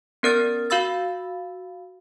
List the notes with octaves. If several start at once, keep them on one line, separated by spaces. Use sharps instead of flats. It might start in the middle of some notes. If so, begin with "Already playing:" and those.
B3 C#4 A#4 D5 F6 A6
F#4 F5 B5 E6 A6